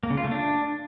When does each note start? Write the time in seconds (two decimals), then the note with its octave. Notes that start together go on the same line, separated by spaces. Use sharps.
0.03 A#3
0.10 C#3
0.17 F4
0.24 A3
0.31 D4